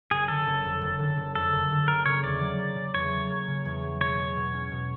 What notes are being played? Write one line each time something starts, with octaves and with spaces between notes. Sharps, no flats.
F#1 G#4
D3 A4
F#1
F2
F#1
D3
F#1
F2 A4
F#1
D3
A#3 A#4
C#3 C#5
E2 D5
F#3
A#3
C#3
E2 C#5
F#3
A#3
C#3
E2
F#3
B2 C#5
G#3
B2
C#4
B2